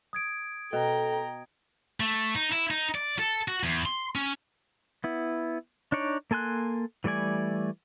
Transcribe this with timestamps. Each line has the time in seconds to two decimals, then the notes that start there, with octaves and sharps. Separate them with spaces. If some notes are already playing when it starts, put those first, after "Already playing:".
0.13 D#6 G#6 D7
0.73 B2 A4 G5 A#5
2.00 A3
2.35 D#4
2.52 E4
2.70 D#4
2.95 D5
3.19 A4
3.48 F#4
3.63 E2
3.86 C6
4.15 C#4
5.04 B3 E4
5.92 D4 D#4 C#5 D5
6.31 A#3 A4 G#5 C6 F#6
7.04 E3 G3 A3 D5 G#5